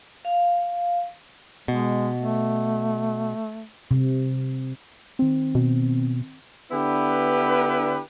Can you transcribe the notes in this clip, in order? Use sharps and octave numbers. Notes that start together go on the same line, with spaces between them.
F5
B2 G#3
A3
C3
D#3 C4
B2
D3 B3 D4 E4 G4 B4